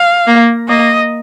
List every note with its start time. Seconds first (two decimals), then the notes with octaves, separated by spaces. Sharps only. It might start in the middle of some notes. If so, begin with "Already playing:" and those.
Already playing: F5
0.27 A#3
0.69 A#3 D#5